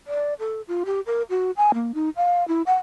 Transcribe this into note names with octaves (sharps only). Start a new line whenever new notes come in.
D5
A4
F4
G4
A#4
F#4
G#5
A#3
D#4
F5
E4
F#5